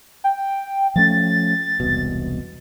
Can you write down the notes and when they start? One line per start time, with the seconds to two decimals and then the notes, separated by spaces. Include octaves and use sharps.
0.24 G5
0.96 F3 A3 C#4 A6
1.80 E1 C2 B2